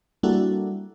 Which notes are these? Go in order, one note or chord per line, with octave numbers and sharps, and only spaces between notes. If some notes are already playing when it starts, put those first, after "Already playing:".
G3 A#3 D4 E4 F#4 A4